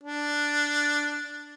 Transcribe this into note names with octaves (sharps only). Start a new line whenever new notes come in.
D4